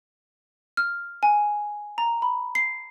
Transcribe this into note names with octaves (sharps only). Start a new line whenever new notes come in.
F6
G#5
A#5
B5
C7